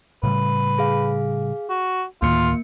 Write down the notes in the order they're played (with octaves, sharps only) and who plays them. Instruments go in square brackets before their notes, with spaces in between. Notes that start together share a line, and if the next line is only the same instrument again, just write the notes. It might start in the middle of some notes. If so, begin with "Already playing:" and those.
[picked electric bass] A2 C#3 G3 [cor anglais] B4
[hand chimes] G#4 F5
[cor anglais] F#4
[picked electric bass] D2 A2 D#3 [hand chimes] A#3 C#7 [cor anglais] F4